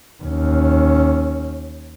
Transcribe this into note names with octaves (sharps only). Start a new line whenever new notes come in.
D#2 C#4